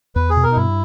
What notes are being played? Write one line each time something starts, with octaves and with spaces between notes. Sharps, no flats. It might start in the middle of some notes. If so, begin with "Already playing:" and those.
E2 B4
G#4
B2
A#4
D#4
G2 E4